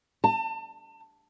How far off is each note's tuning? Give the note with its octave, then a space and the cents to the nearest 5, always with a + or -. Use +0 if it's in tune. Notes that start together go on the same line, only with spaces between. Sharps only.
A5 +35